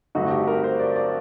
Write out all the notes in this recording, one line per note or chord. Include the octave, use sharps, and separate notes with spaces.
G2 D3 A3 C4 D#4 F#4
G4
A#4
C5
D5
D5